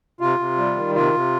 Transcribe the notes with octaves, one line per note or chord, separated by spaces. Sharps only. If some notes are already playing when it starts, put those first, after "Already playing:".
C3 F4
C3
G3
D#3
C3 F4
C3